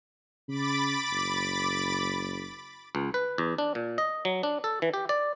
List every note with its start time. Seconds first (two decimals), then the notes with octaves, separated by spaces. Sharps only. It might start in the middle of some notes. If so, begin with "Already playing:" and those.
0.48 C#3 B5 D6 A6
1.11 F#1
2.95 C#2
3.14 B4
3.38 E2
3.58 D4
3.75 A#2
3.98 D#5
4.25 F#3
4.43 D4
4.64 A4
4.82 E3
4.94 G4
5.09 D5